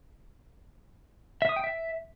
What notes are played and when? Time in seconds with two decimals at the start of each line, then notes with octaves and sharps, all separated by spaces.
1.42 E5
1.49 D#6
1.56 G5
1.64 E5